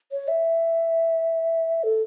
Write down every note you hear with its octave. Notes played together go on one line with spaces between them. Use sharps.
C#5
E5
A4